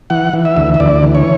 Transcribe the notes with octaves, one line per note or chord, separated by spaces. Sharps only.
E3 F#5
E3
E5
D2
E5
D2 D5
E3
C#5